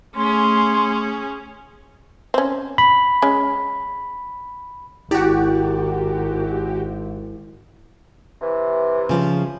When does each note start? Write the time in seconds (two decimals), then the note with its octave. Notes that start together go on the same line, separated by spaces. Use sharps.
0.15 A3 C#4 G#4 C6
2.34 C4 C#4
2.78 B5
3.22 G#3 C#4
5.11 G#1 E4 F#4 G4
8.42 C3 E3
9.09 C#3 F3